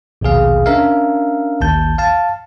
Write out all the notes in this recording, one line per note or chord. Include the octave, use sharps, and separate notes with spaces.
A#1 D#2 B2 G#4 F5
C#4 D4 A#4 E5 F5
A1 D#2 A5 G6
F5 A5